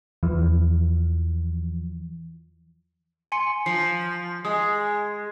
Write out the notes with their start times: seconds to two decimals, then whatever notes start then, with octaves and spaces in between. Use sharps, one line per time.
0.23 E2 E3 F3
3.32 G#5 C6 C#7
3.66 F3 C7
4.45 G#3 D#6